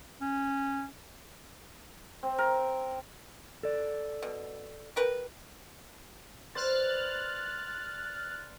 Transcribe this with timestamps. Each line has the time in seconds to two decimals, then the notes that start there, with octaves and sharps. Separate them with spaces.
0.22 C#4
2.23 C4
2.38 A#4
3.63 A4 D5
4.23 B2
4.96 G4 A#4 B4
6.55 B4 C5 D5 F6 F#6 A6